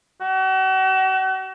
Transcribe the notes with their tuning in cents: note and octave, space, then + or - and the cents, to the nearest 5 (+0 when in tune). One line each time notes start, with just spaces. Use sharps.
F#4 +40